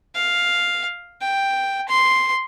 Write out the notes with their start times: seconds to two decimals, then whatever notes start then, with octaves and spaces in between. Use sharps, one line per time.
0.15 F5
1.21 G5
1.88 C6